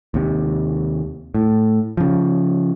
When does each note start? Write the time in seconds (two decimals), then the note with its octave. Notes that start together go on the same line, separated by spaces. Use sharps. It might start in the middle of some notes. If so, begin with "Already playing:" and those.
0.14 D#2 C3
1.34 A2
1.97 C#3 F3